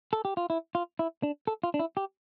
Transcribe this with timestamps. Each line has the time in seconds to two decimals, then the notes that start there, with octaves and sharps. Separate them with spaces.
0.13 A4
0.25 G4
0.37 F4
0.50 E4
0.75 F4
0.99 E4
1.23 D4
1.47 A4
1.63 F4
1.74 D4
1.79 E4
1.97 G4